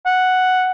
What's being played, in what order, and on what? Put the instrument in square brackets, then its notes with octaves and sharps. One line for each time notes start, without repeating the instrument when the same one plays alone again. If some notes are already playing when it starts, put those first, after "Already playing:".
[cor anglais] F#5